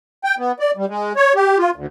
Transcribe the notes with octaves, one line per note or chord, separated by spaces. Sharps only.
G5
B3
D5
G3
G#3
C#5
G4
F4
D2